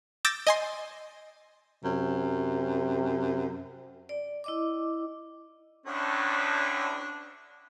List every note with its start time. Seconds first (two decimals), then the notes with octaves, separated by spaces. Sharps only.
0.25 D6 E6 G6 A6 A#6
0.47 D#5 G#5 C6
1.84 F#2 C3
4.09 D5
4.44 E4 D#5 D6
5.86 D2 A2 C#4 D4